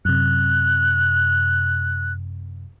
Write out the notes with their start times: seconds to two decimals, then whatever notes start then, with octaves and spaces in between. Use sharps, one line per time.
0.05 F#2 C3 F#6